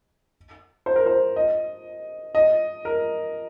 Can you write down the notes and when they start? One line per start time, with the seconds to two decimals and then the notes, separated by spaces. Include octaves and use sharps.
0.86 C5
0.96 A#4
1.06 C5
1.36 D#5
2.35 D#5
2.85 A#4